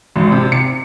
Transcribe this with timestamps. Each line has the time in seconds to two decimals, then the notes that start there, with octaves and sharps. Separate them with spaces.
0.16 G#1
0.32 C3
0.52 C#7